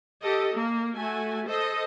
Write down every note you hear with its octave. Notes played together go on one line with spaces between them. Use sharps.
G4 A4 D#5
A#3
A3 F#4 G#5
A4 C5 D#5